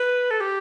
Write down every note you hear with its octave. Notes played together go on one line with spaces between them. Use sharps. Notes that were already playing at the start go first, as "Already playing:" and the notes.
Already playing: B4
A4
G4